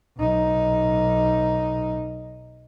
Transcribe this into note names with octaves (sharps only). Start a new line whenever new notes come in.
B1 D#4